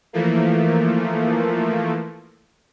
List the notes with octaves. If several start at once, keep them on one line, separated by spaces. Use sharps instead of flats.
E3 F3 A3 A#3